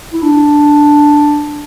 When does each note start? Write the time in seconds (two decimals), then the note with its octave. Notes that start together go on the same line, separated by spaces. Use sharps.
0.13 E4
0.22 D4